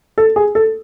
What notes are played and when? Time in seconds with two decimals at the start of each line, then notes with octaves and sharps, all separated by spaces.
0.18 A4
0.36 G#4
0.55 A4